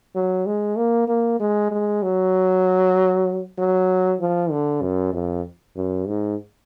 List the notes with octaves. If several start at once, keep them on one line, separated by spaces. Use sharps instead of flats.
F#3
G#3
A#3
A#3
G#3
G#3
F#3
F#3
F3
D3
F#2
F2
F#2
G#2